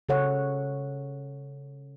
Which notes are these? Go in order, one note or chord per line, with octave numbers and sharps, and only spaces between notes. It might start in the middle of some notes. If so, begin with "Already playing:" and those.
C#3 A4 C#5 F#5